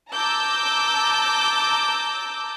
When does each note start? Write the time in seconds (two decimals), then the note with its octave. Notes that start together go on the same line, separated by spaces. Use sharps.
0.11 A5 A#5 D6 E6 G6